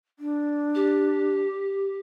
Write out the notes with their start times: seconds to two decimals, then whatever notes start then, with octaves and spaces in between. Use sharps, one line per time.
0.19 D4
0.74 G4